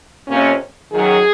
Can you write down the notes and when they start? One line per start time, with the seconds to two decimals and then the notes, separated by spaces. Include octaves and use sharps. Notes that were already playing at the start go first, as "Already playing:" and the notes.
0.27 F2 C3 F3 A#3 C#4
0.91 F#2 D#3 F#3 G#4